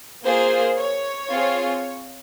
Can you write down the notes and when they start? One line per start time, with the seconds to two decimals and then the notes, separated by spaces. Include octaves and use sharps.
0.24 A#3 F4 G#4 C5
0.76 C#5
1.30 C4 F4 G#4